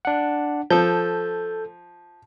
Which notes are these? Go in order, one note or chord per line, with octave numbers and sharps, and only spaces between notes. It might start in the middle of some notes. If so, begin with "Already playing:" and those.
D4 F#5
F3 A4 G6